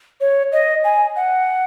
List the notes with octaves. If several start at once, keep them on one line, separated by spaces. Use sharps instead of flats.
C#5
D#5
G#5
F#5